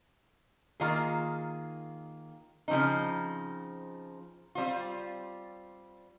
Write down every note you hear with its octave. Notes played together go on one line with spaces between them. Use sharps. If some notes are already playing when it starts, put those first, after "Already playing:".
D#3 A#3 F4 G#4
C#3 F3 C4 D#4
G3 C4 F4